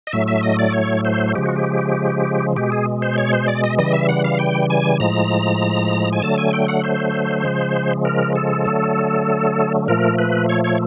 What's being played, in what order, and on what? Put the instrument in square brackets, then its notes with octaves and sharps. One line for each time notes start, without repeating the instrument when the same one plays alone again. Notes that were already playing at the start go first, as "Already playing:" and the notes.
[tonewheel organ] D#5
A2 F#3 A3 E5
E5
D#5
D5
C#5
C5
C#3 F3 G#3 G4
F#4
G4
B2 G#3 G4
G#4
C5
C#5
C5
D5
D#5
C#3 E3 G3 D#5
E5
F#5
F5
G5
G#5
A2 F3 G#3 A#5
G#5
D3 F#3 A3 A5
G#5
G5
F#5
C5
C#3 F3 G#3
A#4
A4
D3 F#3 A3
A#2 F3 A3 A#4
B4
C#5
C#5